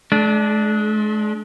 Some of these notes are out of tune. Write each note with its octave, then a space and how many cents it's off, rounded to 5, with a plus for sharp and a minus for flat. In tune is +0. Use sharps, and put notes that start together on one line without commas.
G#3 +45 D4 +0